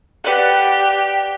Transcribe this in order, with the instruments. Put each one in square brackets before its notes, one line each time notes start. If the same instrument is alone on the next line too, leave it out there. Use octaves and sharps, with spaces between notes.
[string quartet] G4 [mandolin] B4 D5 F#5